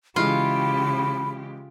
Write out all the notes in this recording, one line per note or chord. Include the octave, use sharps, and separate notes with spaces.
C#3 E3 G#3 F4 G4 B5